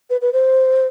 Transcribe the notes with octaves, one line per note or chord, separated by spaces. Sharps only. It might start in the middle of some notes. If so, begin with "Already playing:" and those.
B4
B4
C5